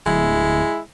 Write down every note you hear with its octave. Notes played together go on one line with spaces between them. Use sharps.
D1 G#3 E4